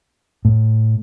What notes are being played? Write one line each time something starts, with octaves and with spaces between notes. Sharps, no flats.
A2